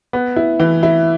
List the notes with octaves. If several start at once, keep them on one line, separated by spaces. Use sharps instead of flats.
B3
E4
E3
E4